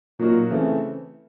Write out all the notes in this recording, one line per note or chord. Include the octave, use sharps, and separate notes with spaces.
A#2 F#3 A#3 D#4 F#4 A#4
C#3 E3 A3 C4